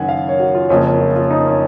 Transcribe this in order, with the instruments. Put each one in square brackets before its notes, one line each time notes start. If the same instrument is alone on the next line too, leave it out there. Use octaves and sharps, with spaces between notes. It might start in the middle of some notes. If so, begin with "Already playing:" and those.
Already playing: [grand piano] F#1 F#2 D#3 F#5 G#5
F5
C#5
F#4
F4
F#1 F2 C#3 F3 A#3 C#4
C#4
F4
F4
D#4
C#4